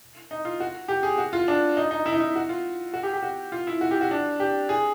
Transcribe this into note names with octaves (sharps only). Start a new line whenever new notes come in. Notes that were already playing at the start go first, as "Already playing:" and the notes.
D#4
F4
F#4
G4
G#4
F#4
F4
D4
D#4
D#4
E4
D#4
E4
F#4
F4
F#4
G4
G4
F#4
F4
E4
F#4
G4
F#4
D4
G4
G#4